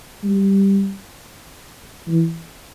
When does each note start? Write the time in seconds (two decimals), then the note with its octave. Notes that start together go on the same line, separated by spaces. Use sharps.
0.23 G3
2.07 E3